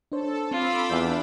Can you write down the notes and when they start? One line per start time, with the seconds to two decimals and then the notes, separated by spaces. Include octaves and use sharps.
0.12 D4 A4 C5 C#5
0.51 C4 F4 B5 D6 E6
0.90 E2 D4 F#5 E6 G6